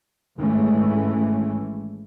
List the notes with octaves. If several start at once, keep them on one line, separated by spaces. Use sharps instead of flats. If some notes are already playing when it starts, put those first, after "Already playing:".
G#1 E3 G#3 A3 C#4